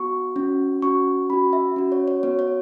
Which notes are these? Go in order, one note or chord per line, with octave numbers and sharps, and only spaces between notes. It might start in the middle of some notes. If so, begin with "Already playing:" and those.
Already playing: B3 F#4 C#6
C#4 F#4
C#4 F#4 C#6
C#4 F#4 B5
E5
C#4 F#4
C#5
C#5
B3 F#4 C#5
C#5